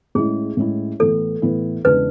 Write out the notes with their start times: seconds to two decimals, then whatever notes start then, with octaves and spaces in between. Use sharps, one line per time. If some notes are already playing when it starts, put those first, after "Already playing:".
0.15 A2 G#3 C#4 E4 G#4
0.57 A2 G#3 C#4 E4
0.99 A2 E3 B3 E4 A4
1.42 A2 E3 B3 E4
1.85 E2 C#3 G#3 D4 B4